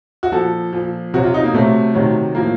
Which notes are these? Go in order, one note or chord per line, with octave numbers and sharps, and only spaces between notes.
F#4
A#2 F3 A4
A#2 F3
C3 F#3 F#4
F4
D#4
A#3
C3 F#3 A3
C3 D#3 F#3
A2 F3 A#3